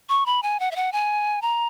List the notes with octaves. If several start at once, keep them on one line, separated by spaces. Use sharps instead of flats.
C#6
B5
G#5
F#5
E5
F#5
G#5
A#5